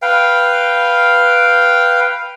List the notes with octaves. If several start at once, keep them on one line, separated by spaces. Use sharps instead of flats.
B4 F5 G5